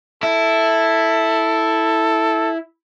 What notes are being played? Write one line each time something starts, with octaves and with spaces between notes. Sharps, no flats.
E4 A4